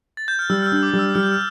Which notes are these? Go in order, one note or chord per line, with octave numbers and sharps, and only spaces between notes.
A6
G6
F6
G3 E6
F6
E6
D4
D6
G3
E6
G3 F6
G6
F6